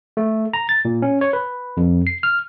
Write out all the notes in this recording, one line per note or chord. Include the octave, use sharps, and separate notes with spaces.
A3
A#5
A6
A#2
C#4
C#5
B4
F2
C7
F6